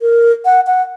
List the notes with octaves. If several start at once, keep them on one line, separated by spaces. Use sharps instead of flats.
A#4
F#5
F#5